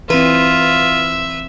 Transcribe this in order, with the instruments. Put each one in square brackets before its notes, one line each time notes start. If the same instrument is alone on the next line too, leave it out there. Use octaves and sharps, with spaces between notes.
[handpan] E3 C4 [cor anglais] F4 [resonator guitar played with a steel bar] B4 [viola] E5